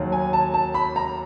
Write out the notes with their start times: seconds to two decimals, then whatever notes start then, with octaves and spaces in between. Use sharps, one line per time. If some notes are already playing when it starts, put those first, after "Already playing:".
Already playing: D#2 D#3 F#3
0.12 G#5
0.33 A5
0.54 A5
0.74 B5
0.96 A#5